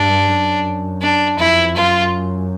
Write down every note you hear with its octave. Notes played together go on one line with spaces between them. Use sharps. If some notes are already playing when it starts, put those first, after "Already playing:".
Already playing: G2 D4
F#2
D4
F2 E4
F#2 F4